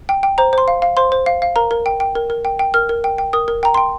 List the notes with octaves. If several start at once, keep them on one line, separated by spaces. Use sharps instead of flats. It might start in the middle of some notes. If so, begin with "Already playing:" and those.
G5
G5
C5 A#5
C5 C6
F5
F5
C5 C6
C5
F5
F5
A#4 A#5
A#4
G5
G5
A#4
A#4
G5
G5
A#4 F6
A#4
G5
G5
A#4 D#6
A#4
G5 A#5
G5 C6